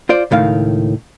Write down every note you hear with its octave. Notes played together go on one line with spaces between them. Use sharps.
F4 C5 D5
C#2 A2 D#3 F5